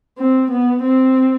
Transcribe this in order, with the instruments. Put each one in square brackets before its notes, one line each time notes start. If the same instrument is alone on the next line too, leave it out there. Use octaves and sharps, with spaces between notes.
[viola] C4
B3
C4